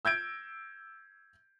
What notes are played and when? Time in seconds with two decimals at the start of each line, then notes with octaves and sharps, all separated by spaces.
0.05 E6 G6 G#6 D7